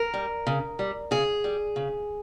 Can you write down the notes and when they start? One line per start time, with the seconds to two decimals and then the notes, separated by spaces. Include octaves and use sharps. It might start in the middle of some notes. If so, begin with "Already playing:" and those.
Already playing: A#4
0.14 G3
0.47 C#3
0.79 G3
1.11 C#3 G#4
1.44 G3
1.76 C#3